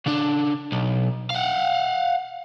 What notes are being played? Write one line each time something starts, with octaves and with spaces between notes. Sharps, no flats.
C#3 D4
B1
F5 F#5